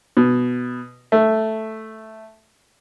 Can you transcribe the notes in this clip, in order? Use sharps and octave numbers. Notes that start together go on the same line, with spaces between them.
B2
A3